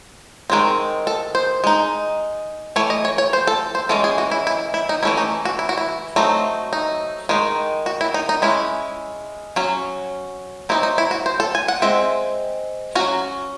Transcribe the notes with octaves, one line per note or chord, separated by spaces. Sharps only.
D#3 G#3 C4
A4
C5
G#3 D#4
E3 A3 C#5
D#5
C#5
C#5
C5
A4
C5
E3 G#3 C#4 A4
G#4
F#4
E4
E4
E4
D#4
E3 A3 C#4 E4
D#4
F#4
E4
F#4
E4
F#3 A3 C4 D#4
D#4
D#3 G#3 D#4
F#4
E4
D#4
D#4
G#3 C#4 E4
F#3 C#4
F#3 C4 D#4 E4
D#4
E4
F#4
C5
A4
G#5
F#5
G#3 C4 E5
F#3 C#4 F#4